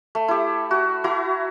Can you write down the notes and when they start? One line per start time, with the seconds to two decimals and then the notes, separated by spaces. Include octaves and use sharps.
0.15 A3
0.28 E4 G4
0.71 F#4
1.04 E4 F#4 A#5